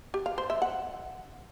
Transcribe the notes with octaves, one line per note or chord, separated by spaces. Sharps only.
G4
F5
C5
E5
F#5